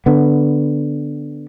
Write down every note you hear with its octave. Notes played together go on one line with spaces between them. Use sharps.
D3 B3